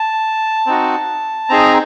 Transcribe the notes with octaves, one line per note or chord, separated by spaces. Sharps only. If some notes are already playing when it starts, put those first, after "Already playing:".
Already playing: A5
C4 D#4 F#4
C4 D#4 G#4 A#5